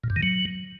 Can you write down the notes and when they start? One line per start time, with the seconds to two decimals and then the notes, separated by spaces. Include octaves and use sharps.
0.04 A#2
0.10 G2
0.16 D#3
0.23 F#3